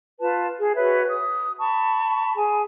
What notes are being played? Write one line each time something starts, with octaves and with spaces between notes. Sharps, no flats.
F4 B4 A5
G#4
F#4 B4 C#5 E5
D#6
A5 B5 C#6
G#4 G#5